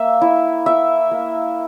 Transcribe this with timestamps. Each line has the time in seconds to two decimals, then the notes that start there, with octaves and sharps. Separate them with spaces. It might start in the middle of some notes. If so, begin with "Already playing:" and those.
Already playing: A#3 E5
0.21 E4
0.66 E4 E5
1.11 A#3